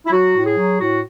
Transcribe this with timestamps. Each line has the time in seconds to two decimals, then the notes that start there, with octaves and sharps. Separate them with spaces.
0.06 E4
0.11 F#3 F#4
0.35 A2
0.45 G#4
0.57 F#3
0.80 A2 F#4